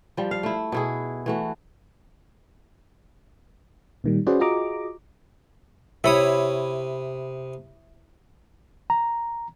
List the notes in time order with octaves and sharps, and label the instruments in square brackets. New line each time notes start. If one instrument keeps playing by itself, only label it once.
[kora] F3 G3
F5
A3 E4
B2 E4 G#4
E3 A3 F#4
[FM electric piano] A#2 D#3 G3
C#4 F#4 G#4 B4 C5 D5
F4 F#4 G#4 D#5 A#5 D6
[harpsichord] C3 B5 D#6 [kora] E4 C#5
[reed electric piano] A#5